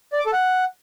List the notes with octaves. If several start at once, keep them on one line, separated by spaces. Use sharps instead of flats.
D5
D6
A4
F#5